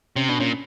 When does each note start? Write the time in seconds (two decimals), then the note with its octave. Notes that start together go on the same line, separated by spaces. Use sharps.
0.16 C3 C#4
0.29 B2 D4
0.40 A#2 C#4